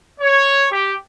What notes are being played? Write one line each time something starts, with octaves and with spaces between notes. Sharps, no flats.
C#5
G4